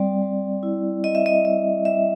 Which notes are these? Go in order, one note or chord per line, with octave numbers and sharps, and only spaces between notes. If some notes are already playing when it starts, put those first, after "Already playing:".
Already playing: G3 C4 D5
G3
E4
C4 D#5
E5
D#5
G3 D#5
G3 E5